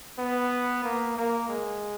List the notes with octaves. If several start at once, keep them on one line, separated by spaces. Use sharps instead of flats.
B3
A#3
A#3
G#3